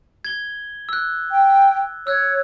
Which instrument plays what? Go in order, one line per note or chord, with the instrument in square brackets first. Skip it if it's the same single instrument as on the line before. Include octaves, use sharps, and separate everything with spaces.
[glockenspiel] G#6 G7
E6 F#6
[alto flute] G5
[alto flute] C#5 [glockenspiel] E6 F#6 G#6